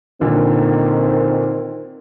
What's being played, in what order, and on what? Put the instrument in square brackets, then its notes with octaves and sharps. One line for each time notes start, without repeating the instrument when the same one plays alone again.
[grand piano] A#2 D3 [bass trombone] D#3 [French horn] C4